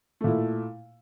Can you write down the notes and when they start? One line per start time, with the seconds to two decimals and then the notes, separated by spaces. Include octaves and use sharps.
0.21 A3
0.24 A#2
0.27 E4